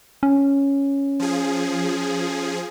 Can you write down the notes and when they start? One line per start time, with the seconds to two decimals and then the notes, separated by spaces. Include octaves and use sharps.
0.23 C#4
1.19 F3 G#4